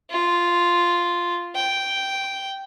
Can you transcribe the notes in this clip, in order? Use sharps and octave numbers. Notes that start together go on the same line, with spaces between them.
F4
G5